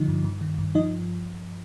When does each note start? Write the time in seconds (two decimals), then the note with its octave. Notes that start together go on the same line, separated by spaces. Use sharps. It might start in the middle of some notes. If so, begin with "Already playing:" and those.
Already playing: D3 F3 D#4
0.08 G2
0.24 G2
0.41 D#3
0.58 G2
0.75 F3 D#4 D#5